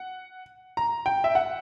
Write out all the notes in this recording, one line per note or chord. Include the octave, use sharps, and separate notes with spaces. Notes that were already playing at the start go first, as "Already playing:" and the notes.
Already playing: F#5
A#5
G5
E5
F#5